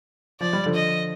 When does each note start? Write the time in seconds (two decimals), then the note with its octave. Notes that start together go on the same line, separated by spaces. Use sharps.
0.40 F3 D5
0.53 G3
0.66 D3 F3
0.75 D#5